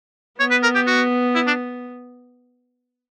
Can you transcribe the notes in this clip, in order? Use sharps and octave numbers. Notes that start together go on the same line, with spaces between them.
B3 C#5
B4
A#4
G4
F#4
E4
D4